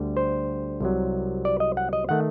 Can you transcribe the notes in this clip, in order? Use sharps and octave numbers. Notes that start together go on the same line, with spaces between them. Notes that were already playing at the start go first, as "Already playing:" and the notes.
Already playing: D2 D3 G3
C5
C2 C3 F#3
D5
D#5
F#5
D#5
D#3 A3 F#5